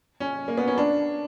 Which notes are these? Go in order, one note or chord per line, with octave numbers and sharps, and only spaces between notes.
C#4
A#3
B3
C#4
D4